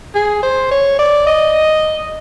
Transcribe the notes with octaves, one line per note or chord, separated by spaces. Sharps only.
G#4
C5
C#5
D5
D#5